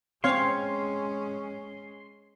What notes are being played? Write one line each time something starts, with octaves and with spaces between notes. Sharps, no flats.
G#3 C4 C#4 C#5 F5 C6